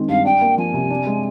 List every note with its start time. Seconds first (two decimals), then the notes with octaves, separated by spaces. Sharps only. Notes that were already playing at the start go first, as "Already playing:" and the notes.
Already playing: D#3 G#3 C4
0.08 G2 F5
0.25 D4 G5
0.41 A#3
0.57 F3 G#5
0.74 C3
0.90 D4
1.07 G#3